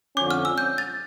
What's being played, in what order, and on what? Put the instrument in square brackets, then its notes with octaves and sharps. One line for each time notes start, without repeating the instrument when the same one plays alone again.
[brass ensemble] F2 D3 F3 C#4 [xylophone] D6
[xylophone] F6
E6
G6
A6